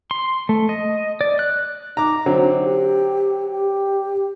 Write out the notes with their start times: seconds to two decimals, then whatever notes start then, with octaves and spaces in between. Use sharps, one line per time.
0.11 C6
0.49 A3
0.69 D#5
1.21 D5
1.39 F#6
1.97 D#4 A#5 D6
2.26 D3 F#3 C4
2.62 G4
3.50 G4